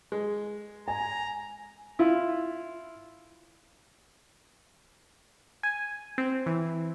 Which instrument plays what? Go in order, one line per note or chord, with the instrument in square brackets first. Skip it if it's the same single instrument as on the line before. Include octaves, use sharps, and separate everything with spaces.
[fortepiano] G#3
[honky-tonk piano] G#5 [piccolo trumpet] A#5
[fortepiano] E4 F4
[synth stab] G#5
C4
E3